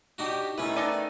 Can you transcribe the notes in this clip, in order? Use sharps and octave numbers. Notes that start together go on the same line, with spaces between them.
D4 D#4 F#4 G4
D#3 A3 C#4 D#4 E4 B4
B3 D#4 D5 A5 D#7